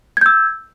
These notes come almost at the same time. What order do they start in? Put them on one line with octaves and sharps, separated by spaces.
G#6 G6 E6